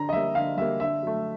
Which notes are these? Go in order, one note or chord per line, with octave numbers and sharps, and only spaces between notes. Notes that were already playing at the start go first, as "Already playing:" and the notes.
Already playing: D3 A#5
D#5
G3 A#3 E5
D3 F5
G3 A#3 E5
D3 E5
F#3 A3